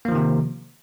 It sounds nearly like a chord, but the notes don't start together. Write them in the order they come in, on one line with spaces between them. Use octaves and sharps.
A#3 F3 D#3 C3